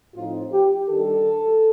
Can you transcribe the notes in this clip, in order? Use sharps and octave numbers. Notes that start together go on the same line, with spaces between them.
A2 F3 C4 D#4 F4
G4
D#3 G3 D4 A4